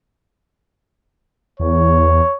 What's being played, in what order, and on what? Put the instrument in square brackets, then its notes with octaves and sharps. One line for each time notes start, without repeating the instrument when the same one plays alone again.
[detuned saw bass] E2 [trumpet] C#5